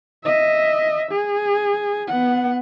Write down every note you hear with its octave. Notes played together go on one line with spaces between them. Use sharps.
D#5 E5
G#4
B3 F#5